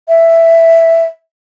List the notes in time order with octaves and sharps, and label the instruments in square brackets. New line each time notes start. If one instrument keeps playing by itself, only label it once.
[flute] E5